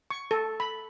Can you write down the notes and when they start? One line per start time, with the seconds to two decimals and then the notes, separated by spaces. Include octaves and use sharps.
0.10 C#6
0.31 A4
0.60 B5